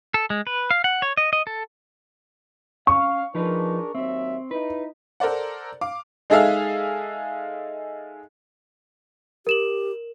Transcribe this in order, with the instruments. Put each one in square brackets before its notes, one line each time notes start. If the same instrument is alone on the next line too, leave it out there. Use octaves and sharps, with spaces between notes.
[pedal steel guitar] A4
G#3
B4
F5
F#5
C#5
D#5
D#5
A4
[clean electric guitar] C#4 [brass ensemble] F5 [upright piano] C#6
[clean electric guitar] F3 D#4 B4 [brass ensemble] D4 G#4 A#4
[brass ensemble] D#2 F#3 E5 [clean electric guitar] C4
[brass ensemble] D#4 E4 [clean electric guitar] B4
[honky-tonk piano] A4 A#4 C5 D5 F#5
F5 D6
[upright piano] G#3 D#4 G#4 A4 E5 F5
[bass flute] G4 [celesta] A#4 E7 F#7